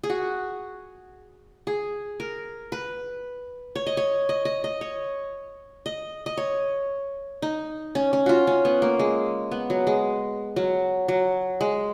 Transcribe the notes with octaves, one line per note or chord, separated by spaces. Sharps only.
G#4
F#4
G#4
A#4
B4
C#5
D#5
C#5
D#5
D#5
D#5
C#5
D#5
D#5
C#5
D#4
C#4
C#4
F4 F#4
C#4
B3
A#3
G#3
B3
F#3
G#3
F#3
F#3
G#3